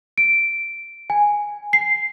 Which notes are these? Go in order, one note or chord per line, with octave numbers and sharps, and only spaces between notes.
D7
G#5
C7